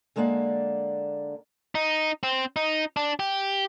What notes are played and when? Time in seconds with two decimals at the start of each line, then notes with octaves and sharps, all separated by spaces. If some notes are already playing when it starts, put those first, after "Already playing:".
0.16 D3 G#3 A#3 D5 F#5
1.75 D#4
2.23 C4
2.56 D#4
2.97 D4
3.20 G4